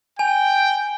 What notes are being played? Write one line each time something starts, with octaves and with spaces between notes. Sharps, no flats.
G5 G#5